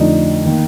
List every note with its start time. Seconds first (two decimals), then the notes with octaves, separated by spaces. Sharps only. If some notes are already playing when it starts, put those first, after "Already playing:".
Already playing: F2 D3 F3 A3 D4 D#4
0.45 D#3 A#3